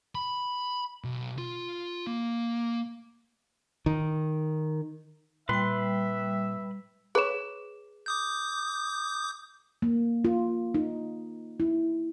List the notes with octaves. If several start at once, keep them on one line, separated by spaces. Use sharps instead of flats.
B5
B1
F4
A#3
D#3
A#2 G3 B4 E5 G5 C6
G#4 B4 C#5 E7
D6 D#6 G6
A#3
F4
D#4
E4